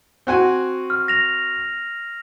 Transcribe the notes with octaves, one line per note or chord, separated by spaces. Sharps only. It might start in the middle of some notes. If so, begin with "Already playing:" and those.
C4 F#4 G#5
F6
A#6 F7